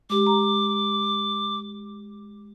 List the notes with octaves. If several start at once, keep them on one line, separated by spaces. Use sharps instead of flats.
G#3 G4 D6
A#5